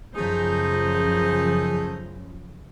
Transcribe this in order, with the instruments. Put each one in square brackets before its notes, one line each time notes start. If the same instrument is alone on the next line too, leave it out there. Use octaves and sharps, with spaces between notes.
[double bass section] F#2 C#3 F3 [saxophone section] A3 D#4 G#4 [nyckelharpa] C5 A#5